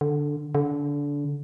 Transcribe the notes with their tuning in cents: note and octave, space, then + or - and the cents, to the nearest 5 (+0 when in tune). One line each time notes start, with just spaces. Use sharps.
D3 +0
D3 -25